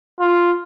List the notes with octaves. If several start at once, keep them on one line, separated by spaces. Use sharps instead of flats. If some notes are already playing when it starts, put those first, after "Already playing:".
F4